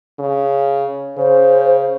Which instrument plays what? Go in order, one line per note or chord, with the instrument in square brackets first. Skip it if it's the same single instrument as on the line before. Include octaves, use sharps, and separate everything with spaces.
[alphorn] C#3
[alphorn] C#3 [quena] C5